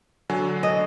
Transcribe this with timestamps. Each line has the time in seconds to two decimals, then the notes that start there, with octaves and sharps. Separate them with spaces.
0.30 D3 F#3 G#5
0.63 D#5